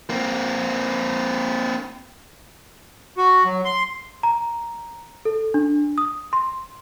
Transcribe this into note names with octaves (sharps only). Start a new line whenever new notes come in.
A#3 C4
F#4
F#3
C6
A#5
A4
D4
D#6
C6